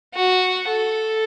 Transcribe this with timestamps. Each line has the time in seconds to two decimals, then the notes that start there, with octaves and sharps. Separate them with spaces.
0.14 F#4
0.68 A4